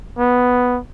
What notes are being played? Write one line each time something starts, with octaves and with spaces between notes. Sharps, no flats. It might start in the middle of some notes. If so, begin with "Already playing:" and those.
B3